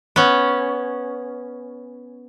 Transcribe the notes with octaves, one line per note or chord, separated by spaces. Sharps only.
B3 C#4